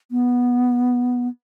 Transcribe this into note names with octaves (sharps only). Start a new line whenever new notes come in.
B3